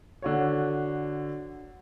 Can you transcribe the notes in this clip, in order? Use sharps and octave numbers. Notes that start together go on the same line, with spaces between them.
D3 F#4 C#5